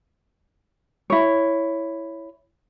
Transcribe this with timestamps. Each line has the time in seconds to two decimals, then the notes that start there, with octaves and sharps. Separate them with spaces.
1.10 E4 C#5